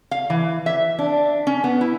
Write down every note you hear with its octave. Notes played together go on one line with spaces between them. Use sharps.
F5
E3
E5
D4
C#4
B3
E4